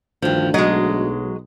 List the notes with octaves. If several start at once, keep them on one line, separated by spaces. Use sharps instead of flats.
D2 G2 D#3 F3
B1 F#3 G#3 D#5